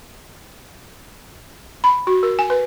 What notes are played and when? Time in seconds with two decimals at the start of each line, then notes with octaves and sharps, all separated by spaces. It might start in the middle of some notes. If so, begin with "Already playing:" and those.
1.84 B5
2.07 F#4
2.23 A#4
2.39 G#5
2.50 B4